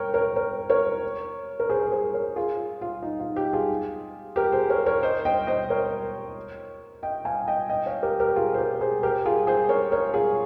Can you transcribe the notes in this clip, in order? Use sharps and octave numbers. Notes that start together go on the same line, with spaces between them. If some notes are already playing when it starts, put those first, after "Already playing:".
Already playing: A#4 C#5 G5
A#4 C#5
A#4 C#5
A#4 C#5
A#4
G#4 C5
A#4
G#4 C5
A#4 C#5
F4 G#4
F4
D#4
F4
D#4 G4
F4 G#4
G4 A#4
G#4 C5
A#4 C#5
A#4 C#5
C5 D#5
D#5 G5
C5 D#5
A#4 C#5
D#5 G5
F5 G#5
D#5 G5
D#5 G5
C#5 F5
G4 A#4
G4 A#4
F4 G#4
C5
G4 A#4
G#4 C5
G4 A#4
F4 G#4
G#4 C5
A#4 C#5
A#4 C#5
F4 G#4